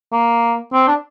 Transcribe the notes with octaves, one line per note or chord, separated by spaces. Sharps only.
A#3
C4
D4